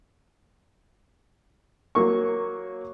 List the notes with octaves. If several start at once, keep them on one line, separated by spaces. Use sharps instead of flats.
F#3 A#3 C#6